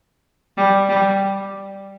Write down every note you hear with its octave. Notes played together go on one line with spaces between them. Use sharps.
G3
G3